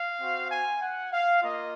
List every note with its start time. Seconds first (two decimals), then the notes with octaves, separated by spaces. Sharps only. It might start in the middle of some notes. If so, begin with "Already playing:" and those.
Already playing: F5
0.20 C4 F#4
0.50 G#5
0.81 F#5
1.12 F5
1.41 A#3 F4 D#5